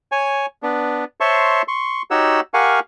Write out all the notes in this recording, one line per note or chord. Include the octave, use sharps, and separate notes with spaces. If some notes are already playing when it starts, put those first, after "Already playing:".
C#5 G#5
B3 D4
C5 C#5 E5 A5 C6 C#6
C6 C#6
D#4 F#4 G4 C#5 F#5 E6
G4 A#4 F5 F#5 G#5 C#6